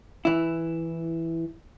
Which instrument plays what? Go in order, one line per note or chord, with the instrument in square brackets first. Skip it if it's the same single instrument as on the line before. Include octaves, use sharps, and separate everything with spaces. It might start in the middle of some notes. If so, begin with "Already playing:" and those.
[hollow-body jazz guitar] E3 E4